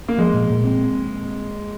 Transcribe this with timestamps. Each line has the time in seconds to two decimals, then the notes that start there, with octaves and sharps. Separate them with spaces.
0.09 A#3
0.18 F3 G#3
0.33 A#2
0.50 A#2
0.65 C4